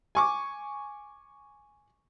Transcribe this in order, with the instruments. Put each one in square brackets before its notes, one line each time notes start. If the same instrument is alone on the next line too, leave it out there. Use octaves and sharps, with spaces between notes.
[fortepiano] G#5 C#6 D6